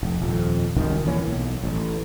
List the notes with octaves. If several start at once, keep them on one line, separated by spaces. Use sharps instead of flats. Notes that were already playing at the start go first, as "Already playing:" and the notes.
F1
D#1 F2
C2 F#2 D#3
D1 E3 A#3 C#4
B1
A1